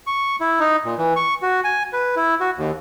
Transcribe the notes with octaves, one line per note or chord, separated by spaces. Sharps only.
C#6
E4
D#4
A#2
E3
C#6
F#4
G#5
B4
E4
F#4
D#2